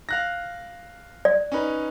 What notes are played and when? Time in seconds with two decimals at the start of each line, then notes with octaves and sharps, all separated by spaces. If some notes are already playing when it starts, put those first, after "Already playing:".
0.09 F5 F#6 A#6
1.25 D5
1.52 C#4 D#4 B4